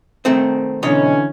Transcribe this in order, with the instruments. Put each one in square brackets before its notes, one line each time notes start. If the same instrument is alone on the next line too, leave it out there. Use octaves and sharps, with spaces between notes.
[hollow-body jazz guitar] D#3 A3 C4
[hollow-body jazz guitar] B1 C#5 D#5 [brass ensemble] D3 E3 C#4